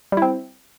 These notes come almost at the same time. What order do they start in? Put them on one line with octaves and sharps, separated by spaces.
G3 E4 C4